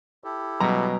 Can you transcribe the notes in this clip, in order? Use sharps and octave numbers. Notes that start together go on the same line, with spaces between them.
E4 G4 A4
B2 F#3 G3 C#4 A#5